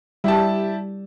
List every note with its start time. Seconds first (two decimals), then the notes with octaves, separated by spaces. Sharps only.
0.24 G3 E4 G4 A5